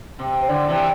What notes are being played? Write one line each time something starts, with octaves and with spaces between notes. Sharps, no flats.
C3
C5
D3 D5
C3 E3